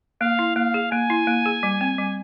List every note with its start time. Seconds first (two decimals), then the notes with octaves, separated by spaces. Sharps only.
0.21 A#3 F5
0.39 E4
0.56 A#3 F5
0.74 G#4
0.92 A#3 G#5
1.10 E4
1.27 A#3
1.46 G#4
1.63 G3
1.81 C4
1.98 G3